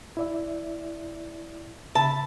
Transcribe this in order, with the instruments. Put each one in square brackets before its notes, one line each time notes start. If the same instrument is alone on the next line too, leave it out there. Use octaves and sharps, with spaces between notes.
[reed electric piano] E4 D5 E5
[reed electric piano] C#3 E5 B5 [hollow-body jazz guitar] A5